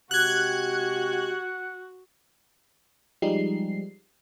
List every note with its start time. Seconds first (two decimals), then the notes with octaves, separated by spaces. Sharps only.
0.11 C3 G#3 F#4 G4 F#5 F#6 G#6
3.22 F3 G3 G#3 D#4 C7